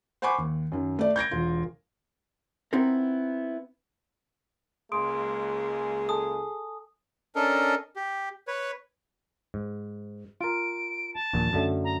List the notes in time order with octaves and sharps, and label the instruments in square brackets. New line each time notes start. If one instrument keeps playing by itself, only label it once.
[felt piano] C5 F#5 G#5 B5 C#6 D6
D#2
F#2 D#3
A3 D5
G6 G#6 A#6 D7
E1 F4
[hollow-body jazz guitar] B3 C4 D#4 E4 A#4
[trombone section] C#2 G#3 A#3 [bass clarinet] G#4 [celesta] C6 D#6 D7
[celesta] A4 G#5 A5 [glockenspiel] D#6
[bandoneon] C#4 D4 A4 A#4 D#5
G4
B4 C#5
[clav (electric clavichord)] G#2
[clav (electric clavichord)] F4 A#4 [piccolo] D7
[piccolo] A5
[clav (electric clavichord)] A#1 D#2 A#2
F#2 D3 A3
[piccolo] A#5